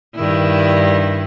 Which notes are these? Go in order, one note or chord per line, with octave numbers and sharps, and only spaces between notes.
G2 D#3 E4